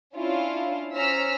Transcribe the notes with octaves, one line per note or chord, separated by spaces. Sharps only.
C#4 D4 E4 F4
C#4 C5 A#5 E6 F6 B6